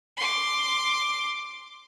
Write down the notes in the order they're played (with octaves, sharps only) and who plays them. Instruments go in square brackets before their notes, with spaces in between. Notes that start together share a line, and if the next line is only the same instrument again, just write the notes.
[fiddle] C6 D6